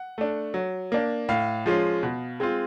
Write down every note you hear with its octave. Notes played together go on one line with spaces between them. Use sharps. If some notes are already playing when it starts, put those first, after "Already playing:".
Already playing: F#5
A3 D4
F#3
A#3 D4
A2 F5
F3 G#3 C#4 F4
B2
G#3 C4 F4